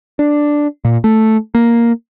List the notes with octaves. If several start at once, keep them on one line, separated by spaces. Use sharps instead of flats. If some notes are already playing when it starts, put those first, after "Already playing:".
D4
A#2
A3
A#3